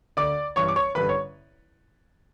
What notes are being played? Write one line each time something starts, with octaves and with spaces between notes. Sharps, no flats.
D2 D3 D5 D6
A1 G2 E3 C#5 C#6
D6
C#5 C#6
A1 G2 D3 B4 B5
C#5